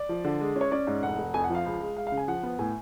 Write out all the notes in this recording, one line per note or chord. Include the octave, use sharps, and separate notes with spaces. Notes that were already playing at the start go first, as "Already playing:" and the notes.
Already playing: D5
F3
D3
G#3
C#4
C#5
C#4 D5
G#2
F1 F#5
F1
F2 G#5
F#5
F3
F5
C#2
G#3
G#3 F5
F5
C#3
G#5
F3 F#5
B3
A2 G#5